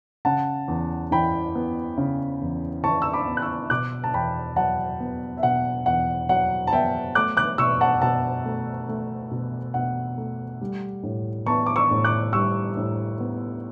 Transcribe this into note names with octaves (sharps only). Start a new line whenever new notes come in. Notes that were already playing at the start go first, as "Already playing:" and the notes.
C#3 F#5 A5
E2
E3 G5 B5
B3
C#3
E2
E3 A5 C#6
E6
B5 D6
B3
F#6
C#6 E6
B2 D6 F#6
A5
E2 G5 B5
F#3 F#5 A5
B3
E5
B2 F#5
E2 F#5
F#3 F#5
A5
B3 E5 G5
A3 D6 F#6
D6 F#6
B2 C#6 E6
F#5 A5
B2 F#5 A5
A3
A3
B2
B2 F#5
A3
G3
A2
B3 A5 C#6
D6
C#6 E6
A2
D6 F#6
G3 C#6 E6
A2
B3